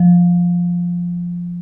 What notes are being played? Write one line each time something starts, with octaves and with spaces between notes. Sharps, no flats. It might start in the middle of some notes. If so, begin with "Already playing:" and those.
Already playing: F3